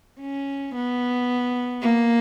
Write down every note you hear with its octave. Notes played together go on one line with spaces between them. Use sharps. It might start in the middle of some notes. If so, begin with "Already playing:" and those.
C#4
B3
A#3